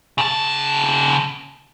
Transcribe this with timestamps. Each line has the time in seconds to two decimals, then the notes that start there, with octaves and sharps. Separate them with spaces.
0.18 C#3 A5